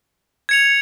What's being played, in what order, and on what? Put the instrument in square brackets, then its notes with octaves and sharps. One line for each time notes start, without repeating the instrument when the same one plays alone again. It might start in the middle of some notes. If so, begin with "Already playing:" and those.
[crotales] G#6 C#7 F7